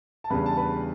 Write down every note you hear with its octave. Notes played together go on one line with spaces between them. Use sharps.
A5
E2 C#3 G3 D4 B4 B5
A5
B4 B5